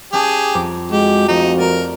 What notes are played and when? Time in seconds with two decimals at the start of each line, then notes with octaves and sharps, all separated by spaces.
0.13 C#4 G4 G#4 A5
0.54 F2 A#5 D6
0.91 G#3 F#4 G4
1.28 F2 A3 D#4 G4
1.58 A#4 D5